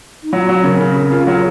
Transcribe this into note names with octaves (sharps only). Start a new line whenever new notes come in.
D#4
F#3 F4
F#4
F#3
C#3 A#4
C#3
C#3
F4
F#3 G#4